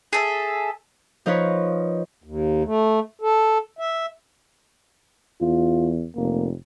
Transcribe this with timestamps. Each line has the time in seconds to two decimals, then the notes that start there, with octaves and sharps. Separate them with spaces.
0.13 G#4 A4 E5
1.26 F3 D#4 A#4 B4 C#5
2.24 D#2
2.64 A3
3.21 A4
3.79 E5
5.41 E2 F4
6.16 F1 A#3